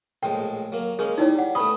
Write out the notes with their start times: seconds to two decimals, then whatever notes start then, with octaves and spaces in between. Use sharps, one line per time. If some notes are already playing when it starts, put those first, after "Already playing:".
0.23 A#1 A2 G#3 G5
0.72 F#3 A#3
0.99 G#3 A#3 C#4 G#4
1.18 G3 D#4 E4 C#5
1.39 F#5
1.55 A3 B3 C#4 B5 D#6